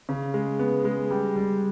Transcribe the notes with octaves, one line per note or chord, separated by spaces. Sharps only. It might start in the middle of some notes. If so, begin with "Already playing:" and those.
C#3
G#3
B3
G#3
G3
G3